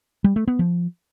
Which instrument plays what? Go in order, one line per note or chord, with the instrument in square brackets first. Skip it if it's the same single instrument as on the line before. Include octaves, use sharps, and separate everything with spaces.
[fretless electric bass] G3
A3
B3
F3